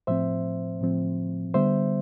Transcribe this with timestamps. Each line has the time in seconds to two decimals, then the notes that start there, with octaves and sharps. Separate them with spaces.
0.07 A2 F3 C4 C5 E5
0.81 A2 F3 C4
1.54 D3 G3 B3 C5 E5